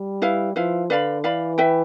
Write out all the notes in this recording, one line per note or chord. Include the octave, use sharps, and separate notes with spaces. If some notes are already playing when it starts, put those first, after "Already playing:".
Already playing: G3
E4 B4 F5
F3 E4 B4 F5
D3 B4 D5 F5 B5
E3 B4 D5 F5 B5
B4 E5 G5